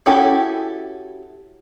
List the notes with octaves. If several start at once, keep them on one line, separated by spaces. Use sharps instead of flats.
C#4 E4 F#4 G4 A4